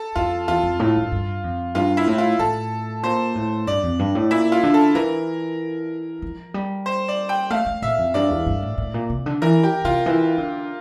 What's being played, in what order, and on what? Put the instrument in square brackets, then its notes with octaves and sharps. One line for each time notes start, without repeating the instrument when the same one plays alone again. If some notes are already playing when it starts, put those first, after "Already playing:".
Already playing: [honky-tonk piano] A4
[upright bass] F2 [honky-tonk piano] F4
[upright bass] E2 [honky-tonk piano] F4
[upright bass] F2
A2
G2
G2
F2
[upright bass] G2 [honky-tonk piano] F4
[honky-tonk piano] E4
[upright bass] A2
[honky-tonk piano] F4
[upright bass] A2 [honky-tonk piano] A4
[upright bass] A#2 [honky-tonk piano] C5
[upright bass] A2
[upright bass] G2 [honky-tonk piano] D5
[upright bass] F2
G2
A2
[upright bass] A#2 [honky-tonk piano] E4
[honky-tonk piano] F4
[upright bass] D3
[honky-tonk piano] A4
[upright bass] E3 [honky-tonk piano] A#4
[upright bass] F3
G3
[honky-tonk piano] C5
D5
G5
[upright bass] A3 [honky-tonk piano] F5
[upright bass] A3
[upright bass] A#2 [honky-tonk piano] E5
[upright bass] F2
[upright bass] G2 [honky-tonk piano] D5
[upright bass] E2
G2
A2
A2
A#2
C3
D3
[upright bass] E3 [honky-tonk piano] A#4
[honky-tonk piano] G4
[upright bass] C3 [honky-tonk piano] F4
[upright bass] E3
D3